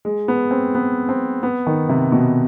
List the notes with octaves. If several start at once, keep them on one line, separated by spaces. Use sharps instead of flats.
G#3
B3
C4
B3
C4
B3
D#3
C3
B2